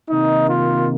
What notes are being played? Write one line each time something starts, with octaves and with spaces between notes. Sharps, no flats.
C3 D#3 A#3 D#4
F4